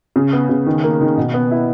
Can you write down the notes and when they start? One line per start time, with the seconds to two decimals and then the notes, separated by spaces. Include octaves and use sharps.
0.16 C#3
0.33 B3
0.49 C#3
0.66 D#3
0.84 A#3
1.01 D#3
1.17 B2
1.34 B3
1.51 E4